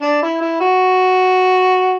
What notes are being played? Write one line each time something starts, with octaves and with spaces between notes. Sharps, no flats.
D4
E4
E4
F#4